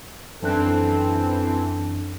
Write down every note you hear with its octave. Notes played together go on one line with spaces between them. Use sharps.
F#2 E3 C4 D4 A4 F#6